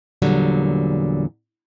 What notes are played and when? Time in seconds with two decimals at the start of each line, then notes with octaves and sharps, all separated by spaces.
0.22 E2 A#2 D3 F#3 G3